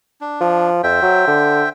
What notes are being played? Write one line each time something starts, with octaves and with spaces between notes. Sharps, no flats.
D4
F3
F2 C5 E5 G5
F#3
D3